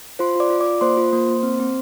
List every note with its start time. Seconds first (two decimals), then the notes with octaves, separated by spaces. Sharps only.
0.19 F4 C5 C6
0.35 F4 D5 D6
0.50 F4
0.60 D5 D6
0.67 F4
0.81 A#3 C5 C6
0.97 F4
1.13 A#3
1.29 A#3
1.43 C4
1.59 C4